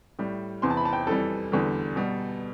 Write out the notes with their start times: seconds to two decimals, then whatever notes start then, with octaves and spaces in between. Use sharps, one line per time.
0.19 A2 G3
0.62 E2 C3 E3 C6
0.70 A5
0.77 B5
0.85 A5
0.93 G5
1.07 F2 E3 G3 A4
1.52 E2 D3 G3
1.96 B2 G3